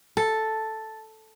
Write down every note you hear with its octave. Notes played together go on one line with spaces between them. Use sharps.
A4 A5